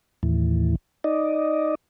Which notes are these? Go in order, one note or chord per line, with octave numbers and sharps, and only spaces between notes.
D#2 A2 E3
D#4 D5 D#5